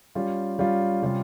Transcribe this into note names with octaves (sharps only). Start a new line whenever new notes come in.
G3 C#4 F4
G3 C#4 F4
C3 G3 C#4 F4